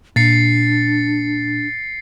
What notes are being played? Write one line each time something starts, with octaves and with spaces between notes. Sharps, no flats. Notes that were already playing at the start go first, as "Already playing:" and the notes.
A#2 D4 A6 C7 C#7